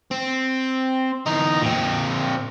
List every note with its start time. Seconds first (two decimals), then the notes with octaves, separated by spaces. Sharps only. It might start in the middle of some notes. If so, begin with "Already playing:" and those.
0.11 C4
1.26 E2 D#4
1.62 A#2 C4